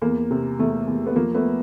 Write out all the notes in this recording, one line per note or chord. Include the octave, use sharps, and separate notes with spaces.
E2 A#3
C3
E2 A3
E2
B3
F3 A#3
A3 B3